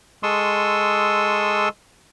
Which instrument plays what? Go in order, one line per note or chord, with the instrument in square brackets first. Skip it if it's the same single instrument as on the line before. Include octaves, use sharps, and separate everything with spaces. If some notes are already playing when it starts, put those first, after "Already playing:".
[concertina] G#3 A4 C6 C#6 D#6 E6